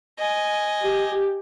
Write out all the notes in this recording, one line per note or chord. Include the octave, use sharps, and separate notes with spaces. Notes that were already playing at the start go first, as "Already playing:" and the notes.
D#5 G#5
G4